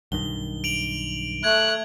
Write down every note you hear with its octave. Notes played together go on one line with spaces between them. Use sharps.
B1 G2 D#3 G7
D7 F7 F#7
A3 F#6 G#6